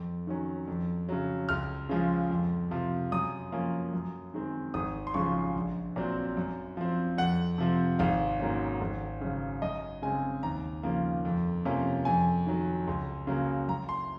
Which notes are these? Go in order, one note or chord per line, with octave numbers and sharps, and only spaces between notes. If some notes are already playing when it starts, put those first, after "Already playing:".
Already playing: F2
D#3 F#3 C#4
F2
C#3 F#3
C#2 F6
C#3 F3 G#3
F2
C3 F3
F#2 D#6
F3 A#3 C#4
F#2
D#3 G#3 C4
G#1 D#6
C6
F#2 C#3 F3 G#3 C#6
A#1
A#2 F#3 C4
F#2
F3 C4
F2 F#5
C3 F3 C4
G#1 F5
G#2 F#3 A#3 C#4
G#1
F#2 C#3
F#2 D#5
C#3 G#3 C4 G#5
D#2 A#5
C#3 F3 A#3
F2
C3 F3 A#3 C#4
F2 G#5
D#3 F#3
C#2
C#3 F#3 A#3
F#2 A#5
C6